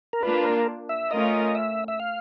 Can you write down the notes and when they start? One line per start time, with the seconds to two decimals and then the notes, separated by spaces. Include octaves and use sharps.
0.13 A#4
0.23 A#3 D4 F4 B4
0.44 A#4
0.89 E5
1.11 A3 C#4 F4 A#4 D#5
1.55 E5
1.88 E5
2.00 F5